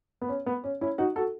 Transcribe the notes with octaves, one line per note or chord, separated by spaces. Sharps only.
B3
C#4
B3
C#4
C#4 E4
D#4 F#4
F#4 A4